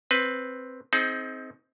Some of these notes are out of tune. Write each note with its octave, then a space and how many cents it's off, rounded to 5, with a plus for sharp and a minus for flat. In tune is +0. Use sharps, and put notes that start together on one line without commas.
C4 +5 B4 +5
C4 +0 D#4 +25 G#4 +40